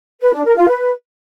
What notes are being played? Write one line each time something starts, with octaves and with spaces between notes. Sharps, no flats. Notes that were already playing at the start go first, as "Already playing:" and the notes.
B4
D4
A#4
F4
B4